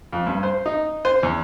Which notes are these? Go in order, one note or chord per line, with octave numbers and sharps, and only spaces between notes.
F2
G2
C5
D#4
C5
E2